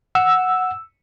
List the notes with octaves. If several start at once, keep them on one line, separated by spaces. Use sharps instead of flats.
F#5 E6